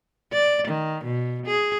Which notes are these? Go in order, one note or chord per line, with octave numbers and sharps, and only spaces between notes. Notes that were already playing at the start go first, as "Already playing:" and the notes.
D5
D#3
B2
G#4